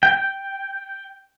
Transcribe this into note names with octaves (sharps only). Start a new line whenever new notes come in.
G5